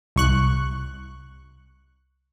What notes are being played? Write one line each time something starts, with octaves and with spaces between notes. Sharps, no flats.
C2 C#6 F#6